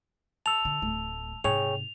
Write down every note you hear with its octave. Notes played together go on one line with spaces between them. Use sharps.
A5 E6 F7
D3
D1 A3
G#2 C3 G#4 C#5 G5 F7